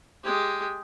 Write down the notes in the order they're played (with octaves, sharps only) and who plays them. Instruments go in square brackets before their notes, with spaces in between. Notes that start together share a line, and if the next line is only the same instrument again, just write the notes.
[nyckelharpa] G#3 G4